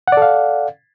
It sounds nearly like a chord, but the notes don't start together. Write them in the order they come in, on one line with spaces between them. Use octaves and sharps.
F#5 D5 A4 F5